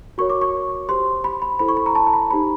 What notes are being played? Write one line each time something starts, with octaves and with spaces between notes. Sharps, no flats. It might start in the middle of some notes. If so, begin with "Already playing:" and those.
F#4 A#4 C#5 C#6
D6
C#6
G4 C5 C6
B5
B5
E4 A4 C5 B5
C#6
B5
A#5
A5
A#5
B5
D#4 G4 C5 B5